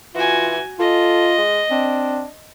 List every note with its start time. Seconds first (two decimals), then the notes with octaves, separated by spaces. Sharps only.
0.15 E3 F4 F#4 G#5
0.80 F4 A4 D#5
1.38 G#3
1.71 C4 D4